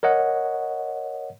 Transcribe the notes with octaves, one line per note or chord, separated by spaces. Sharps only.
A#4 C#5 D#5 F#5